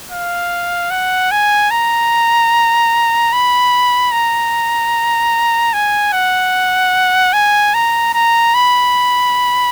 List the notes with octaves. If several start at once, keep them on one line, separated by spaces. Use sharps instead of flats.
F5
F#5
G#5
A#5
B5
A#5
G#5
F#5
G#5
A#5
A#5
B5